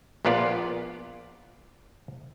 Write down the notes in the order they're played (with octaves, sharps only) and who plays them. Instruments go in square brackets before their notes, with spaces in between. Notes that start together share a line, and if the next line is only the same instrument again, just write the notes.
[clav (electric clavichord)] A#1 A#2 B3 F4 D5